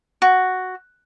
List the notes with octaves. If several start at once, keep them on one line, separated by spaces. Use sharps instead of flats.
F#4